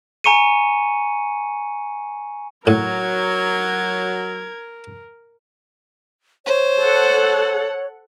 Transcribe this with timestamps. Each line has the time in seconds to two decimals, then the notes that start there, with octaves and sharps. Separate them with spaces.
0.24 G#5 A#5 C#6 C#7 D#7
2.67 A2 F#3 A#4 G#6
6.46 C5 C#5
6.81 A4 F#5